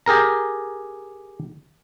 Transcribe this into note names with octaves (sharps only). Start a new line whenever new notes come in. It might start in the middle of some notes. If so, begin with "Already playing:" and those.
G4 G#4 A#4 A#5